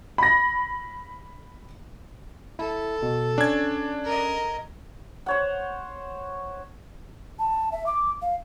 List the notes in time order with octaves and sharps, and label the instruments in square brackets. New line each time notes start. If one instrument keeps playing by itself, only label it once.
[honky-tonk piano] B5 A#6
[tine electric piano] E4 [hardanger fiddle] A4
[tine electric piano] B2
[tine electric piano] C#4 [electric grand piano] D4 G#6
[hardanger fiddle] A#4 D#5
[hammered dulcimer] C5 C#5 F#5
[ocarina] A5
E5
D6
F5